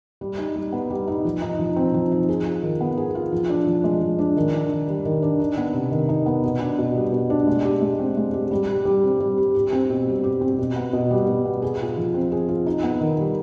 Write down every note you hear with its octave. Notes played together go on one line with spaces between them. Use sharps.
G3
D#4
G3
B3
G3
D#4
F3
D#4
F3
C4
F3
D#4
G#4
F4
D#3
B3
G#4
F4
F3
D4
F3
G#3
F3
D4
D#3
D4
D#3
G3
D#3
D4
D#4
B3
C3
D#3
D#4
B3
B2
D4
B2
G3
B2
D4
G#3
G4
G#3
C4
G#3
G4
G3
G4
G3
C4
G3
G4
G4
C4
B2
G3
G4
C4
B2
B3
B2
G3
B2
B3
G#4
F4
F3
C4
G#4
F4
D#4
B3
D#3
G3